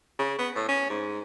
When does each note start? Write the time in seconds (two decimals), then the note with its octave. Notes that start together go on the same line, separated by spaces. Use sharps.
0.19 C#3
0.39 B3
0.56 A2
0.69 C#4
0.90 G#2